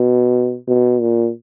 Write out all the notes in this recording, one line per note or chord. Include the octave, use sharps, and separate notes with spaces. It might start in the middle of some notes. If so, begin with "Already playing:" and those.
Already playing: B2
B2
A#2